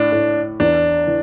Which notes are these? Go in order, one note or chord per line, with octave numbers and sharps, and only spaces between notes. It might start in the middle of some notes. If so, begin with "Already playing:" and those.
Already playing: A2 D4
A2
E2 D4
E3